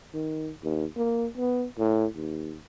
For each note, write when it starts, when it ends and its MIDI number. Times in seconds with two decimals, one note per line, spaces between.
0.13 0.51 51
0.63 0.85 39
0.97 1.27 58
1.37 1.65 59
1.79 2.06 45
2.15 2.56 39